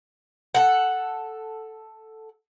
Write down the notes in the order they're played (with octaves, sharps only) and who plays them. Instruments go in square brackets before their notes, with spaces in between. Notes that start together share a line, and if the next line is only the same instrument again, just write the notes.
[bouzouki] A4 F#5